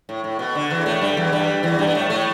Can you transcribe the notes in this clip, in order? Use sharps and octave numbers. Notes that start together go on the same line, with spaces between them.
A2
A2
B2
D3
E2 E3
A2 A3
G2 G3
E2 E3
G2 G3
E2 E3
G2 G3
B3
A2 A3
A2 A3